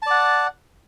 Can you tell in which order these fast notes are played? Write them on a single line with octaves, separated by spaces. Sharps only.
A5 D5 F#5